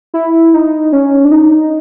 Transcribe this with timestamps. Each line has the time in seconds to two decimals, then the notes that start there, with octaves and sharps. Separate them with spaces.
0.14 E4
0.54 D#4
0.92 C#4
1.25 D4
1.32 D#4